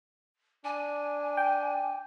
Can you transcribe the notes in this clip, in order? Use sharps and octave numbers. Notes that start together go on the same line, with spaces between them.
D4 G#5
G5